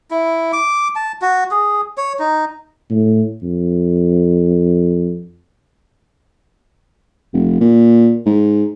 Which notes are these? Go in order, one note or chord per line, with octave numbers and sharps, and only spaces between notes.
E4
D6
A5
F#4
G#4
C#5
D#4
A2
F2
F1
A#2
G#2